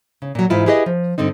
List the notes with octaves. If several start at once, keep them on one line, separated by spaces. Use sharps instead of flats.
C#3
A#2 F#3
G#2 E3 E4 F4
E4 G4 G#4 B4 C5 D#5
F3
G2 D3 C4 D#4